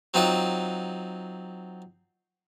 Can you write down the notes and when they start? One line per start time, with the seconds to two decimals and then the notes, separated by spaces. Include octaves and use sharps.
0.14 F#3 C4 D#4 F4 F#5